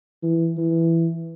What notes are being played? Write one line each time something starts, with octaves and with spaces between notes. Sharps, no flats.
E3
E3